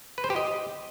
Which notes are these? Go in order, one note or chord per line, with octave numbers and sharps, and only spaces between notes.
B4
C5
G4
D#5